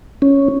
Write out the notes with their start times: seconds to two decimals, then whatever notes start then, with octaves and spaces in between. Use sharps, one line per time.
0.22 C#4